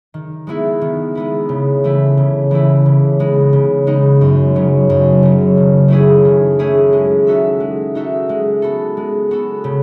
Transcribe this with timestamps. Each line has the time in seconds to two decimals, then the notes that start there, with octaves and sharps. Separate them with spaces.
0.14 D#3
0.47 G#3 B3 E4
0.81 D#3
1.15 G#3 B3 E4
1.49 C#3
1.84 E3 A3 E4
2.17 C#3
2.51 E3 A3 E4
2.86 C#3
3.19 G#3 B3 D#4
3.53 C#3
3.87 G#3 B3 D#4
4.21 F#2
4.55 C#3 F#3
4.90 F#2
5.22 C#3 F#3
5.57 D#3
5.88 A3 C#4 E4 G#4
6.25 D#3
6.59 A3 C#4 E4 G#4
6.93 G#3
7.27 D#4 F#4 A4 E5
7.60 G#3
7.95 D#4 F#4 A4 E5
8.29 G#3
8.62 B3 F#4 A4
8.97 G#3
9.31 B3 F#4 A4
9.64 C#3